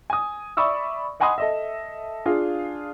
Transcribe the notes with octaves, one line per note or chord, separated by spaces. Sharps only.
G#5 D#6
D5 E5 B5 C#6 D#6 E6
D#5 F#5 G#5 B5 C6 D#6
A4 D#5 E5
D4 F4 G#4 F5